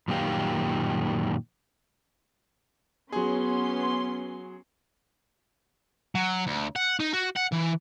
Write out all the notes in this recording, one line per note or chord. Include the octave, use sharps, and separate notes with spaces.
F#2 A#2 D#3 G4 F5
F#3 B3 C#4 G#4 C6
F#3
D2
F#5
D#4
F#4
F#5
E3